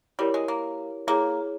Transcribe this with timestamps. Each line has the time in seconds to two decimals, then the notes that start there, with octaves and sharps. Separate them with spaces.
0.19 G3 E4 G4 A#4 C#5
0.34 G#3
0.48 A#3
1.07 A#3 E4 G#4 C#5